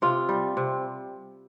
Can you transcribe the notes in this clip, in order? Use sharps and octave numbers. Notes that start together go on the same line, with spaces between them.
C3 F4
G3
C3